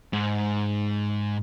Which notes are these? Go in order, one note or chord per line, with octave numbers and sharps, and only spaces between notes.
G#2